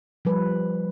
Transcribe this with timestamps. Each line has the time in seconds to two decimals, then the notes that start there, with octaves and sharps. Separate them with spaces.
0.25 F3 G3 B4